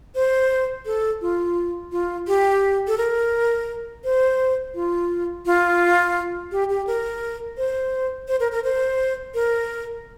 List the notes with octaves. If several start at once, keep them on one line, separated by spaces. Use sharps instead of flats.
C5
A4
F4
F4
G4
A4
A#4
C5
F4
F4
G4
G4
A#4
C5
C5
A#4
A#4
C5
A#4